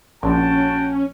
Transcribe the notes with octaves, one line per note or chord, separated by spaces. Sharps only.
A#1 C#4 F#4 G5 A5